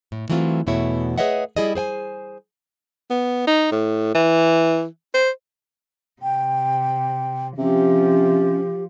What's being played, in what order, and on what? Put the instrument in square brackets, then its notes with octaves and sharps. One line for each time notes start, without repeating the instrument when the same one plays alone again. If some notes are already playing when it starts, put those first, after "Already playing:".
[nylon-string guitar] A2
E3 F#3 A3 C4 F4
E2 B2 A3 E4 C#5
G#4 B4 C#5 D#5 E5 F#5
G3 E4 G#4 D5 D#5
G#4 C5 G5 G#5
[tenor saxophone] B3
D#4
A2
E3
C5
[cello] C3 [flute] G5
[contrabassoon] C3 [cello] F3 [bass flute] C#4 [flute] G4